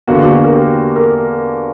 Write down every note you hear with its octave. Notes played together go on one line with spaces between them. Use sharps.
E2 D3 A#3 F#4
F#4
A#4
G4
A#4